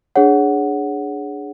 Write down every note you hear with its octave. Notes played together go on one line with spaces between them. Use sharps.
D4 G#4 C#5 F#5